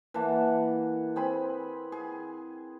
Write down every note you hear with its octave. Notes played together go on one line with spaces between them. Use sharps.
E3 A#3 F#5 A5
C4 G#4 B5
G#4